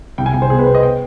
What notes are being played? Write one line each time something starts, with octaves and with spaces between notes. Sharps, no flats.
C2 G5
G#5
C2 G5
C5
B2 G#4
B4
B2 C5
D#5
G5